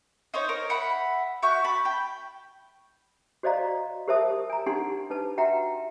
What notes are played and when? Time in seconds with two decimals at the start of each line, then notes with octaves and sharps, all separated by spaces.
0.34 D#4 C5 C#5
0.49 A#4
0.70 E5 F#5 B5
1.43 F#4 E5 C#6 G6
1.64 A5 B5
1.85 G5
3.43 F#4 C5 D5 D#5 F5 A#5
4.08 G4 A#4 C5 E5 A5 D#6
4.50 G#5 A#5
4.66 D4 D#4 G4 F#5 G#5 C6
5.10 D4 D#4 B4 A5
5.38 F#4 E5 F#5 G5 A#5